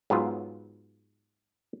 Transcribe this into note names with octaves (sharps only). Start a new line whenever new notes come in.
G#2 F#3 B3 F4